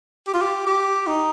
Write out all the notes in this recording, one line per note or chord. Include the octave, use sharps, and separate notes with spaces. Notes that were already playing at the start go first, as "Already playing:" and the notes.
G4
F4
G4
G4
D#4